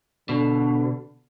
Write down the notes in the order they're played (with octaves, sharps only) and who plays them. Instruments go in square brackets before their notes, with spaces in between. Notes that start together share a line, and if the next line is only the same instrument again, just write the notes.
[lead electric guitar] B2 [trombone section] D3 A4